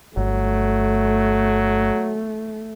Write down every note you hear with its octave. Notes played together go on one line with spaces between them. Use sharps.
G1 F#3 A3